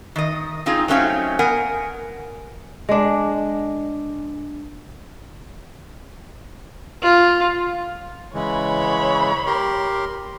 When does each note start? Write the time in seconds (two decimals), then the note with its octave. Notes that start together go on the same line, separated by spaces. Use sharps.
0.16 D#3 D#5
0.66 C4 D#4 F4 G#4
0.88 F#3 A3 C4 C#4 D#4 F5
1.39 B3 A#4 F#5 G#5
2.89 G#3 D4
7.02 F4
8.34 C#3 E3 G#3 C#5 B5
9.46 G4 A#4 C6